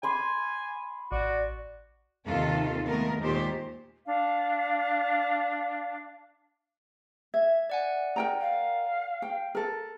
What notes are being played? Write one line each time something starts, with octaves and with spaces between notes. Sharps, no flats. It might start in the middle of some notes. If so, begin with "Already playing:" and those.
G#5 B5 C6 D6
A1 F#4 D5
D#2 C3 D#3 F4 A4
D#3 G#3 A3 B3 A#4
D#2 A#2 D#3 G#3 G4 C5
D4 F5
E5 G#6
D5 F#5 G#5
A#4 G5 A#5
F5
G5
A4 A#4